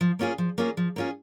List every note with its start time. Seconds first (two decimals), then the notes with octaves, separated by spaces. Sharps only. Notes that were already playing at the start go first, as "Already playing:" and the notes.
0.01 F3
0.19 A#3 C#4 F4 G#4
0.38 F3
0.58 A#3 C#4 F4 G#4
0.77 F3
0.96 A#3 C#4 F4 G#4